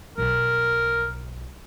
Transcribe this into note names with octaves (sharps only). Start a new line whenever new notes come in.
B1 A#4